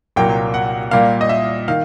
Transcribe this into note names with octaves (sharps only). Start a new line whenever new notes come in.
C2 A#2 F#3 A#3 G5
F#5
A#2 G3 A#3 F5
D#5
E5
D#3 F5